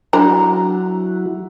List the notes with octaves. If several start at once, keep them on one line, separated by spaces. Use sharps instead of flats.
F#3 D4 E4 F#4 A#5